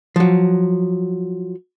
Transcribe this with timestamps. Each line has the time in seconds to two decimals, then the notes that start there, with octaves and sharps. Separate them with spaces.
0.16 F3 F#3